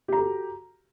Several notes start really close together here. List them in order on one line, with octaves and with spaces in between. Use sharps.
G4 A#5 A4 F#4